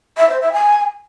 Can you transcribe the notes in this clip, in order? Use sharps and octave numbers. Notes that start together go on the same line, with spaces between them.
E5
C5
E5
G#5